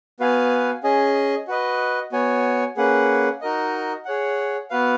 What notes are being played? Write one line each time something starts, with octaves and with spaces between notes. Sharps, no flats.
B3 F#4 B4 F5 G#5
C#4 G#4 D#5 G#5
F#4 B4 D#5
B3 F#4 C#5 G#5
A#3 C#4 G#4 B4 F#5
D#4 F#4 A#4 D#5
G#4 C#5 F#5
B3 F#4 B4 F5